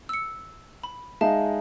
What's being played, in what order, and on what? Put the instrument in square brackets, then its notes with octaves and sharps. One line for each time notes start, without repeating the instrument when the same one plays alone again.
[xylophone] E6 C#7
B5
[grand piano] G#3 D#4 [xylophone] E5 F5 A5